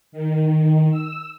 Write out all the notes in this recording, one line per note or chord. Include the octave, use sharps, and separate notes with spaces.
D#3
E6